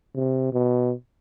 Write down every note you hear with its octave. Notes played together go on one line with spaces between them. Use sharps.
C3
B2